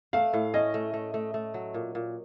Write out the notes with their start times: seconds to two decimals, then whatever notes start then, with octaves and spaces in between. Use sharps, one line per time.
0.13 A3 F5
0.34 A2
0.54 C#4 D#5
0.74 A3
0.94 A3
1.14 A3
1.34 A3
1.54 F#3
1.74 A#2
1.95 A#2